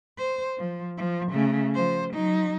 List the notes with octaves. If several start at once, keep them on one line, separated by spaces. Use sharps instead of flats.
C5
F3
F3
C#3 A3
F3 C5
F#3 D#4